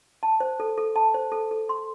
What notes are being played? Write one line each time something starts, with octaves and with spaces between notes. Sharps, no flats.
A5
C5
A4
A4
A5
C5
A4
A4
C6